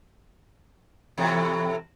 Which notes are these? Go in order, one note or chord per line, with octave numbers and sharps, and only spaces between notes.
E2 A2 C3